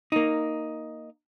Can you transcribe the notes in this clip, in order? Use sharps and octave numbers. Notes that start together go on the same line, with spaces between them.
A#3 D#4